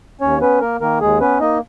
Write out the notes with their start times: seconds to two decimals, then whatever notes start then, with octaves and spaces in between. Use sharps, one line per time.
0.21 D#2 C#4 C#5
0.41 B3 C#4 B4
0.61 A#3 A#4
0.80 D#3 A#3 A#4
1.00 D#2 G#3 G#4
1.20 B3 C#4 B4
1.40 A#3 D#4 D#5